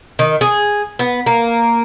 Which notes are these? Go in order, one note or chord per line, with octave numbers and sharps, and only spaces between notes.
D#3
G#4
B3
A#3